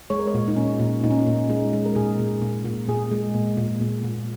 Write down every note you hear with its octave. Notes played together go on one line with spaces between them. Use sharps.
G#3 C#5
A#4
C#5
A#2
D#4
A#2 C#4
A#2
A#2 D#4
C#4
D#4
A#2
G#3 D#4
G#3
A#4
A#2 G#4
A#2
A#2
A#2
A#2 G#4
G#3
A#2
A#2
A#2
A#2